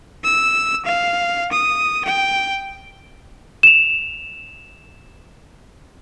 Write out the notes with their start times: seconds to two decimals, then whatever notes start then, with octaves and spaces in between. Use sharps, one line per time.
0.24 E6
0.85 F5
1.52 D#6
2.05 G5
3.63 E7 F7